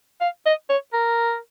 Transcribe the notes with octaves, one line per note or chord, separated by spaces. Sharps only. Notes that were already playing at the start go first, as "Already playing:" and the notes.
F5
D#5
C#5
A#4